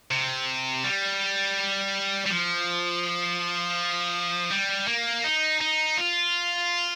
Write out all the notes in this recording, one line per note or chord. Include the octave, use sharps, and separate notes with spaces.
C3
G3
G3
F3
G3
A#3
D#4
D#4
F4